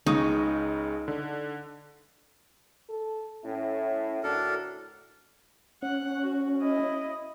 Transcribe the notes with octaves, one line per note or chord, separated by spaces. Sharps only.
C#2 C#3 D#4 C#6
D3
A4
A2 C#4 E4
A2 D3 D4 F#4 A4 A#4
C#4 F#5
F#4
E4 D#5